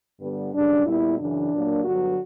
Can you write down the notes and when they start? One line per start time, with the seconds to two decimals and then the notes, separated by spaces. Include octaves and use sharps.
0.19 G2 D3 G3 B3
0.52 F#2 C#3 G3 D4
0.86 A#2 G3 B3 E4
1.18 F#2 C#3 E3 D4
1.52 A#2 F#3 A#3
1.84 G2 D3 F#3 B3 F#4